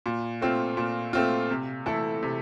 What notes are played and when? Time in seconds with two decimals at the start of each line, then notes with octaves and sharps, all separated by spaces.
0.06 A#2
0.42 A3 C4 F4
0.77 A#2
1.13 A3 C4 F4
1.50 C3
1.86 E3 A3 E4 A4
2.23 C3